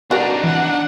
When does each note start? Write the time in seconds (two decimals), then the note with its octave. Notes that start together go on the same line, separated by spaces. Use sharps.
0.11 D4 D#4 F#4 A#4 B4 D5
0.44 E3 F#5